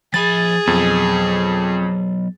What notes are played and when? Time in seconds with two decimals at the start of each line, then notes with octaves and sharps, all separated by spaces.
0.14 F3 G#4 B5 A6
0.67 F2 F#3 B3